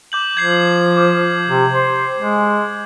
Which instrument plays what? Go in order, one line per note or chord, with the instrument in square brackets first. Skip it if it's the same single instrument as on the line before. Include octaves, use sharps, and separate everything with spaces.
[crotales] D6 G6 F#7
[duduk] F3 [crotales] G#6 C7 F#7
[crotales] D6
[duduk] C3
C5
G#3